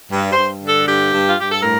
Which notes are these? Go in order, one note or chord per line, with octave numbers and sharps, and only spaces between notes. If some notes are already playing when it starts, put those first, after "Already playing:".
G2
C5
G2
D3
A4
G2 G4
G2
F4
G2 G4
A4
A2 A#4